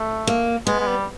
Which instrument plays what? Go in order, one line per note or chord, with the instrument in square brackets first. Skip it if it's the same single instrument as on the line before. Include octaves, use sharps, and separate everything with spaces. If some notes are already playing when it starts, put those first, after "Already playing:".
Already playing: [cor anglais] A3
[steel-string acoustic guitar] A#3
[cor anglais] G#3 [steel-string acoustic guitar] B3
[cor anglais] G#3
G3